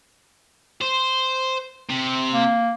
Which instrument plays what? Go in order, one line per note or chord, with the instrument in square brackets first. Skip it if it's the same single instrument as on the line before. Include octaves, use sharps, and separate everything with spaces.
[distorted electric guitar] C5
C3
[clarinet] A#3